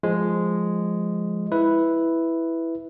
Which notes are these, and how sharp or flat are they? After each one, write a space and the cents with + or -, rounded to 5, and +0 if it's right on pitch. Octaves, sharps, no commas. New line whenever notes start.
F3 +0 G#3 +0
E4 +0 B4 +0